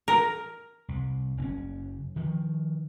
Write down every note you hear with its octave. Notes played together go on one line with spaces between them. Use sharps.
A#4
C2
F#1 C4 C#4
D#3 F3